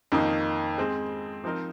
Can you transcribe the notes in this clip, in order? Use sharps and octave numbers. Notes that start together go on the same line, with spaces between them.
F2 D#3 A#3 D#4
G#3 C4 G#4
F3 C4 D#4 A#4 D#5